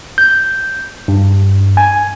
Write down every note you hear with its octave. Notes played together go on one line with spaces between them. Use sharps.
G6
G2
G#5